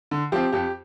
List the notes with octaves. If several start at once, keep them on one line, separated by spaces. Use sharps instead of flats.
D3
F3 C4 G4
F2 G4